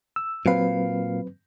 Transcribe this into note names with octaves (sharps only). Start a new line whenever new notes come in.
E6
A#2 F#3 C4 B4 F5